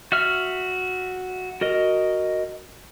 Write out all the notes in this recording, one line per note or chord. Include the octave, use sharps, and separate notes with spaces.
F#4 E5 F6
F#4 A#4 D#5